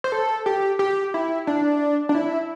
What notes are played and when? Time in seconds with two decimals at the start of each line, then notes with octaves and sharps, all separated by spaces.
0.04 C5
0.12 A4
0.46 G4
0.79 G4
1.14 E4
1.47 D4
2.09 D4
2.15 E4